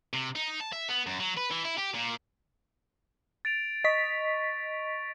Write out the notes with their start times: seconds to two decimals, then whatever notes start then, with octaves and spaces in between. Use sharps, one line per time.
0.13 C3
0.36 D#4
0.60 A5
0.73 E5
0.89 B3
1.07 F#2
1.20 F#3
1.37 B4
1.50 E3
1.65 E4
1.78 G4
1.95 A#2
3.45 A6 D7 F7
3.84 D#5 C#6 B6